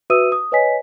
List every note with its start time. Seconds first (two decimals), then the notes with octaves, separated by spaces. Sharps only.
0.10 F#4 B4 E5 D#6 E6 D#7
0.32 D#6
0.52 B4 C#5 D#5 G#5 B6